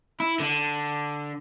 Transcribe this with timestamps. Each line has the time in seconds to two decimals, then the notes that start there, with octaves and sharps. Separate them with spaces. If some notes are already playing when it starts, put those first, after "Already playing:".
0.20 E4
0.40 D3